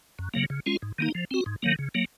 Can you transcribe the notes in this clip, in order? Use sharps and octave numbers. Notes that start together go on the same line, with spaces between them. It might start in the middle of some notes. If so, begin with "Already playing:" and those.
F#2
C#3 F#3 A#3
C#3
G#3 C#4 F4
G#2
D#3 A#3 D#4
F3
C4 F#4
G#2
D#3 F#3 A#3
C#3
F#3 A#3